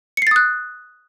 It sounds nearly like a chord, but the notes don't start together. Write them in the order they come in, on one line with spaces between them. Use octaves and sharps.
C#7 C7 A6 D#6 F#6